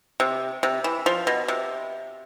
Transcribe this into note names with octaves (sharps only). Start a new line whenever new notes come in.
C3
C3
E3
F3
B2
C3